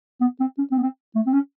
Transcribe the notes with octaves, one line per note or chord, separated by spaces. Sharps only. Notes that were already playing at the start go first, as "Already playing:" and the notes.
B3
C4
C#4
C4
B3
C4
A3
C4
C#4